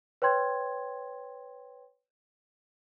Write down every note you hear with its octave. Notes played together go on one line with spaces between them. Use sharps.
B4 C#5 G5 C6 G#6